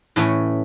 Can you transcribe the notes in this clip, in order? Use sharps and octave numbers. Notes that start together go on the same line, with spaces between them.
A2 E3 A3 C#4